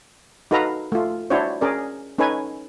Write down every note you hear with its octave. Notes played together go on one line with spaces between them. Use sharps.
D#4 F#4 A4 B4 F5 A#5
A3 F4
D4 E4 F#4 C5 C#5
C#4 G#4 A#4 D5
C#4 D#4 A4 B4 C#5 G#5